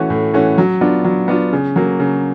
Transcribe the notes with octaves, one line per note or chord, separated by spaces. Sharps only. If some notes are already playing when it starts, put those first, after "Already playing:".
Already playing: E3 A3 C#4 F#4
A2
E3 A3 C#4 F#4
F#3
B3 D4 F4
F#3
B3 D4 F4
C#3
F#3 A#3
C#3